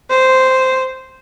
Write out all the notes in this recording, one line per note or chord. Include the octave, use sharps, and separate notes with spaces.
C5